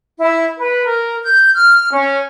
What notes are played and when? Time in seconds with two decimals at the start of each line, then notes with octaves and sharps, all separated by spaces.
0.19 E4
0.57 B4
0.84 A#4
1.21 G6
1.54 F6
1.91 C#4